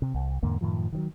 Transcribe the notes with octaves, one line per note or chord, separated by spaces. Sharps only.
C3
C2
E2 G#2 D3 A#3
F#2 A2 D#3 F3
D#3 E3 F#3